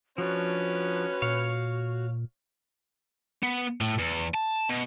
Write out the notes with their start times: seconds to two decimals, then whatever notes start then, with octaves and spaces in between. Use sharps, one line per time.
0.18 F3 C#4 D4 F#4 B4
1.22 A#2 C#5 F5
3.43 B3
3.81 A2
3.99 E2
4.34 A5
4.69 B2